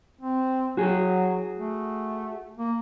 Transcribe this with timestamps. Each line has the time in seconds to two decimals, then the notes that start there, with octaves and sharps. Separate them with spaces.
0.21 C4
0.77 F#3 F#4 G#4
1.58 A3
2.57 A#3